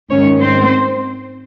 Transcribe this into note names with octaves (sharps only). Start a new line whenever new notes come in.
G#2 D#3 C#4 C#5
C4 C5